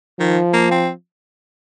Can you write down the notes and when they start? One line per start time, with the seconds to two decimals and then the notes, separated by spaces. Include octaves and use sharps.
0.19 D#3 F3
0.53 A#3
0.71 C4